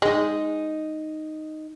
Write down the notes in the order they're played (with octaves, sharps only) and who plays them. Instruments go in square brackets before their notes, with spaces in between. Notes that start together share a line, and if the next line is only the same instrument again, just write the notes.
[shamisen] G#3 [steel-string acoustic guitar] D#4 D#5